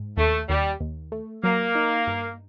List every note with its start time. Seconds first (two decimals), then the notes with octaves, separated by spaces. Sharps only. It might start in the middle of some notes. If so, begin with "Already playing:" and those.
Already playing: G#2
0.17 D#2 A3
0.48 D#2 G3
0.80 D#2
1.12 A3
1.43 F#3 A#3
1.75 D#4
2.07 G2